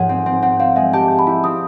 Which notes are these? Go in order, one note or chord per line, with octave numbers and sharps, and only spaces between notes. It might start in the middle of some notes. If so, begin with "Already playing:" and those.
Already playing: G#2 F3 G#4 C#5 F#5
C4
C4
C4 F#5
C4 F5
G#3 E5
G4 A5
G4
B5
E4
C4 D#6